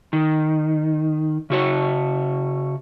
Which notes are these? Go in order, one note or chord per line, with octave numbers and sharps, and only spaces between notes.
D#3
C#3 F#4 C#5